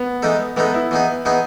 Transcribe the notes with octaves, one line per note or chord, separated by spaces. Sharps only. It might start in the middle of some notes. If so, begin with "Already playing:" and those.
Already playing: B3
E3 G#3 D#4 A4
E3 G#3 B3 D#4 A4
E4
E3 B3 D#4 G#4
E3 B3 D#4 G#4